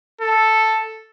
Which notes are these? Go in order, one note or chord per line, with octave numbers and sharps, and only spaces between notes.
A4